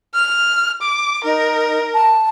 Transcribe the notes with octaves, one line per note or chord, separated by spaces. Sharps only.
F6
D6
D#4 A#4
A5